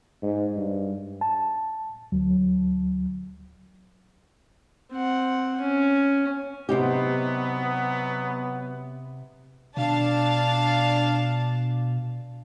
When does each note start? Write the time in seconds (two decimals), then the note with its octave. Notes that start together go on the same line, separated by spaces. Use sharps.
0.22 G#2
0.56 G2
1.21 A5
2.12 D2 F#3
4.91 C4 F#5
5.61 C#4
6.69 C3 F#3 B3 D#4 G4
9.77 B2 D4 F5 A5